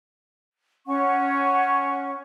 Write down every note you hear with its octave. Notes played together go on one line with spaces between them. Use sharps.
C#4 F#5 C#6